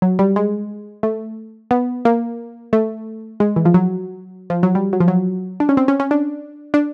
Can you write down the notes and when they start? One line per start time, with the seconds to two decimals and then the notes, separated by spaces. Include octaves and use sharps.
0.02 F#3
0.19 G3
0.36 G#3
1.03 A3
1.71 B3
2.05 A#3
2.73 A3
3.40 G#3
3.56 E3
3.65 F3
3.74 F#3
4.50 F3
4.63 F#3
4.75 G3
4.93 F#3
5.00 F3
5.08 F#3
5.60 D4
5.69 C#4
5.77 C4
5.88 C#4
6.00 C#4
6.11 D4
6.74 D4